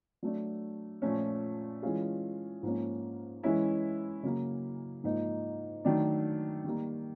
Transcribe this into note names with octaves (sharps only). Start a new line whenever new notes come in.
F#3 A3 D4
A#2 F3 A3 C#4
E3 G#3 C#4 F4 G#4
G#2 F3 A#3 C#4
E3 G#3 C#4 E4
C#3 F#3 A#3
G#2 F3 A#3 D#4
D#3 F#3 A3 D4
D#3 G3 A#3